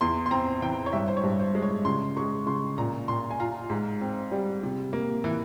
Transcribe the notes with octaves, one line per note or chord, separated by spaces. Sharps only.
E2 C6
C6
C4 A#5
E3 G5
C#5
G2 E5
C5
C#5
G2
C5
G#3
C#5
C#3 C6
G#3 C#6
C#3 C6
A#2 A#5
A#2 C6
G#5
F4 A#5
G#2
C4
G3
C3
A#3
E3